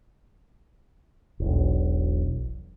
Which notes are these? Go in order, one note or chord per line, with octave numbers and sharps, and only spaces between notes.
E1 B1